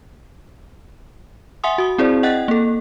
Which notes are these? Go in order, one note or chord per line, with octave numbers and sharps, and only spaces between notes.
E5 F#5 G#5 C6 D#6
F#4 D#6
C4 E4 G#4 C5 D5
D#5 F#5 G5 F#6 A6
A#3 A4